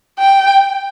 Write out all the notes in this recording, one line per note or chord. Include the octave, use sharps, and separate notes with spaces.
G5